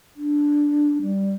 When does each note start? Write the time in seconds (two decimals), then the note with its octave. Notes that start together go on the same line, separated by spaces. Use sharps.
0.16 D4
1.02 G3